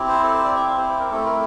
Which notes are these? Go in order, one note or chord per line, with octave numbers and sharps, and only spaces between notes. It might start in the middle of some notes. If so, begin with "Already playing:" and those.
Already playing: C4 E4 G4
C5
A4
C5
D5
E5
F5
C5
C5
A#4
A3 C4 E4 A4
A#4